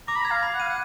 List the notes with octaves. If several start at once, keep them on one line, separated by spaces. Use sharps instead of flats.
A#5 D6
B5
A#5 G#6
F5
B5
F#5
F5 D#7
F#5